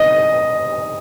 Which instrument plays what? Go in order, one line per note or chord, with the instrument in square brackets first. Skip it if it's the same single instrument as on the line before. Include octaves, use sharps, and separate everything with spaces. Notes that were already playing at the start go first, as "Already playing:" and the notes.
Already playing: [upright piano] D#5